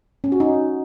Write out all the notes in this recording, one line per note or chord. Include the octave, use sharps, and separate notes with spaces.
C#4
F#4
D#4